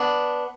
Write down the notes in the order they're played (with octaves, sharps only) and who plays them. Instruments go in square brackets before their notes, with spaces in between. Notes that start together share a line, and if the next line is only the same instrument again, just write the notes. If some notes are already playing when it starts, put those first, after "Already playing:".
Already playing: [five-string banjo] B3 D4